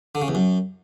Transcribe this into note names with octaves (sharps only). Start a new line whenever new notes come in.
D3
C#3
E2
F#2